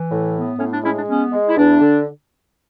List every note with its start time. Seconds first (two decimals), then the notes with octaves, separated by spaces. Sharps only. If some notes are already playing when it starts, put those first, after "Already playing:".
Already playing: E3
0.11 A2
0.36 B3
0.59 A2 C#4
0.72 D4
0.84 G#3 C#4 E4
0.96 D4
1.08 B3 C#4
1.32 G#3
1.47 E4
1.57 E2 D4
1.81 D3